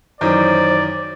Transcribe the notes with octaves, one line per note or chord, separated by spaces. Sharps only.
F#2 D#3 E3 C5 D5